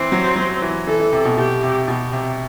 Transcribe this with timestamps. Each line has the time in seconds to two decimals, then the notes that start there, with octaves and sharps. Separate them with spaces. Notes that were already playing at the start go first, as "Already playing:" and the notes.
Already playing: E3 C4
0.12 F#3
0.36 F#3
0.62 E3
0.87 E3 A4
1.00 E3
1.12 C3
1.25 B2
1.37 B2 G4
1.63 C3
1.87 B2 G4
2.12 C3